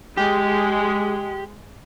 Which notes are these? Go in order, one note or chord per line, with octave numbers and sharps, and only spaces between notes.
G#3 G4